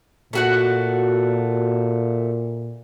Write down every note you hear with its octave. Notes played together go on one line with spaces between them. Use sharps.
A#2 A3 F#4 F#5